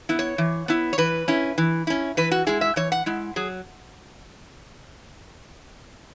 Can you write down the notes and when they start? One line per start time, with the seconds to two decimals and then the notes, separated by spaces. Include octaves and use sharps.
0.09 B3 E4
0.19 C#5
0.38 E3
0.68 B3 E4
0.93 C#5
0.98 E3 B4
1.28 C#4 E4
1.58 E3
1.87 C#4 E4
2.17 E3 B4
2.31 F#4
2.47 G#3 E4 G#4
2.61 E5
2.76 E3 C#5
2.92 F#5
3.06 G#3 E4
3.36 F#3 G#4